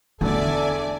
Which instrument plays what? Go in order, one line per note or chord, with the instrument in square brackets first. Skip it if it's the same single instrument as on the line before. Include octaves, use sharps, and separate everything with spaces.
[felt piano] E2 D3 [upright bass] A3 E4 [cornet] A4 [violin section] D5 E5 G#5